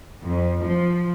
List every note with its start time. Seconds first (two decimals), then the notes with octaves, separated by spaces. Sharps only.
0.22 F2
0.62 F3